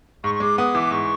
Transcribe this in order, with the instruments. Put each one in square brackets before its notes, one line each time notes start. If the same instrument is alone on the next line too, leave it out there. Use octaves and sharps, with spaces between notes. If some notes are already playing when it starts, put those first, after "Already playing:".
[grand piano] G#2 [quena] C#6
[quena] C#6
[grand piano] G#3 [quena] D6
[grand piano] B3 [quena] D#6
[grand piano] E3 [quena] D6
[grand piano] G#2 [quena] C#6